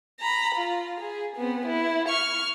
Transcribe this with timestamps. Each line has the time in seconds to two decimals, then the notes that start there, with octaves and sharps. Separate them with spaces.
0.20 A#5 B5
0.55 F4
1.00 G#4
1.36 B3 C4
1.65 E4
2.08 C#6 F6